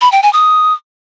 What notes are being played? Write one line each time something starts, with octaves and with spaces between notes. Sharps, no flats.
B5
G5
G#5
D#6